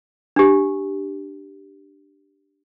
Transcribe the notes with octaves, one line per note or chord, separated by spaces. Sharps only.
D4 G4